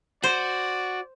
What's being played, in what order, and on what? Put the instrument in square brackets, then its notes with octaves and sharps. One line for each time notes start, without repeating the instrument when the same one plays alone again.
[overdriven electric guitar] F#4 [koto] C5 [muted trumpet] D5